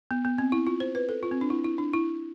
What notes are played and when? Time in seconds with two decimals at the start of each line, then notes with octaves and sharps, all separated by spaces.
0.11 B3
0.25 B3
0.38 C4
0.52 E4
0.67 F4
0.80 C5
0.95 B4
1.09 A4
1.23 F4
1.31 C4
1.41 D4
1.50 E4
1.64 E4
1.78 D4
1.93 E4